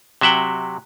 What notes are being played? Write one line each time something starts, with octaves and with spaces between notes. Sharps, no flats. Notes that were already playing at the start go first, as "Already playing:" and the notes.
C3 F#3 E5 F#5 G5